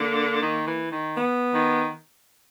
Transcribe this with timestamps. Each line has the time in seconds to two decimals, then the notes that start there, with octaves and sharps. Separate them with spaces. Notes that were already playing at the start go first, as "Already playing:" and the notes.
Already playing: D3 A#3
0.42 D#3
0.67 E3
0.92 D#3
1.17 B3
1.54 D#3